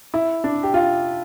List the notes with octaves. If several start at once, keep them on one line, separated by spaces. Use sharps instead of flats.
E4
D4
G4
F4